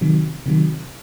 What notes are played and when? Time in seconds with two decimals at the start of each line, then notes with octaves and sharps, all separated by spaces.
0.01 C3 D#3 F#3
0.46 C3 D#3 F#3